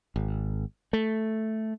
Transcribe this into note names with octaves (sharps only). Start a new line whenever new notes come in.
G#1
A3